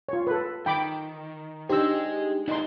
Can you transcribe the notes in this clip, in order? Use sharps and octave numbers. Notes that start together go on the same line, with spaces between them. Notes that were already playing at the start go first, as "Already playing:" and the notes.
F4 C#5
A4 B4
D#3 G5 B5 D6
D4 D#4 G4 G#4 C5 D#5 E6
D#4 E4 B4 D5 C6